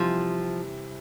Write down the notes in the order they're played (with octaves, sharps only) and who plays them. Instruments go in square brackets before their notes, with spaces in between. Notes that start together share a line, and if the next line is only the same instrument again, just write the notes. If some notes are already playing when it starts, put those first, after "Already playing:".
Already playing: [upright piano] C3 E3 G3 [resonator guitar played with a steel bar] F3